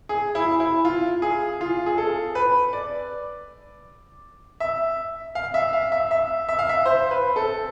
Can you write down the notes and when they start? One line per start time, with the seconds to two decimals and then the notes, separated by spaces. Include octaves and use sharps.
0.09 G#4
0.35 E4
0.60 E4
0.85 F4
1.22 G#4
1.61 F4
1.86 G#4
1.98 A4
2.35 B4
2.73 D5
4.60 E5
5.35 F5
5.54 E5
5.73 F5
5.92 E5
6.11 E5
6.49 E5
6.59 F5
6.69 E5
6.86 C5
7.11 B4
7.36 A4